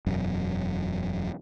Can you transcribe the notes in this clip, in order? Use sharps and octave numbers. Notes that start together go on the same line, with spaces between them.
E1 F#2